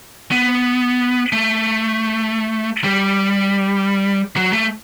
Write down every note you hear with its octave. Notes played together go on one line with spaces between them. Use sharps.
B3
A3
G3
F#3
A3